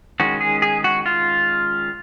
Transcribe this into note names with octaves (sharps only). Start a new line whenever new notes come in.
D#3 G#3 C#4 F#4
G#4
G#4
F#4
F4